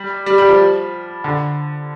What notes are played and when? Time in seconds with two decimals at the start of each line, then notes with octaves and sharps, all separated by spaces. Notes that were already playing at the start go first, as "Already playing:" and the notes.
Already playing: G3
0.26 G3
0.38 G3
0.49 F3
1.24 D3